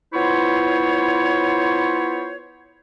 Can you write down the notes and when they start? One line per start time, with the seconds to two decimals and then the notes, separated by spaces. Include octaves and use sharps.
0.13 B3 E4 F4 C5 C#5